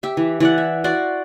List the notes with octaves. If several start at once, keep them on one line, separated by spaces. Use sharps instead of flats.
G4 E5
E3
E3 D5 F#5
E5
F#4 D5 C6